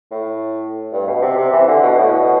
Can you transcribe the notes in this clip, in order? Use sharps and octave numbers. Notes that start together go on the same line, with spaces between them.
A2
G2
B2
C3
C3
E3
D3
B2
A2
B2